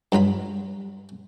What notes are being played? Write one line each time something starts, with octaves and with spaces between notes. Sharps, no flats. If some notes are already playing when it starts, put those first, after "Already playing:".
G2 F#3 F4 B5